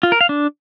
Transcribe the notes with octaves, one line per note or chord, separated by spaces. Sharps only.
F4
A#4
F5
D4